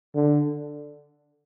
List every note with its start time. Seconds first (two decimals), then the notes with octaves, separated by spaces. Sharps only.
0.15 D3